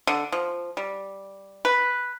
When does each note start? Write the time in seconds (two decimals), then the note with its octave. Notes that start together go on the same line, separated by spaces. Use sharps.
0.07 D3
0.32 F3
0.77 G3
1.65 B4